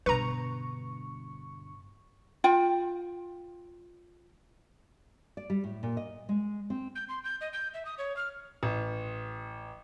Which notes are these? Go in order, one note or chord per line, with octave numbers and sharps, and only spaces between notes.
G2 B2 D3 B4 A#5 C#6
F4 G5
D5
G3
A2
A#2
D#5
G#3
C4
G6
C6
G6
D#5
G6
E5
D#6
C#5
F6
A1